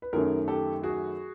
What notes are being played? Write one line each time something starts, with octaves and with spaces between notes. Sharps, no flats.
B4
F#2 D#3 F#3 A3 G#4 A#4
G4 A4
F#4 G#4